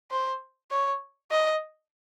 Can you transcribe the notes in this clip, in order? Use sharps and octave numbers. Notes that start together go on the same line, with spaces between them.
C5
C#5
D#5